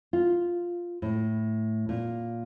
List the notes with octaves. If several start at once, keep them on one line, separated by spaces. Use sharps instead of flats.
F4
A2
A#2